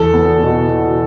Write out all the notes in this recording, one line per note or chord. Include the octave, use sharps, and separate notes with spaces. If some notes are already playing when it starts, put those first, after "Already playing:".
Already playing: E2 A4
B3
B2